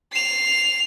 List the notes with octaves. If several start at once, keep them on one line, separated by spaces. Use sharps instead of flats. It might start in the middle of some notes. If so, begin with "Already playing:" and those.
C7 F7